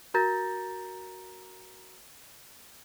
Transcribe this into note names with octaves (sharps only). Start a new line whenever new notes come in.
F#4 A#4 A#5 G6 A6 A#6